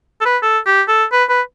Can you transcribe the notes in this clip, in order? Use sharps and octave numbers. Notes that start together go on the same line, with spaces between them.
A4
B4
A4
G4
A4
B4
B4